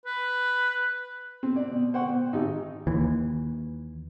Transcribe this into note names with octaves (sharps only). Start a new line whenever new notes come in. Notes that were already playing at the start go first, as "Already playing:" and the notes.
B4
C4
D5
B2
C5 F#5 G5 C#6
B2
G#1 D#4 G4
D#2 E3